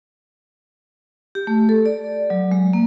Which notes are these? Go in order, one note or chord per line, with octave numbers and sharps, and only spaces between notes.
G4
A3
A4
D5
F#3
G#3
A#3